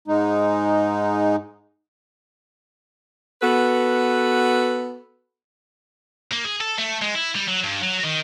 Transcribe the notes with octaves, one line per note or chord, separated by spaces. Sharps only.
G#2 G#3 D#4
B3 F#4 A4 B4
A#3
G#4
A4
A3
G#3
E4
G3
F#3
G2
F#3
D#3